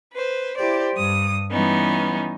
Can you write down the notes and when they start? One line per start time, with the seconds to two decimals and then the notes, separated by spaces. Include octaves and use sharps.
0.14 B4 C5
0.57 E4 G4 C5 D5
0.96 G2 D#6
1.52 E3 G3 B3 C#4 D#4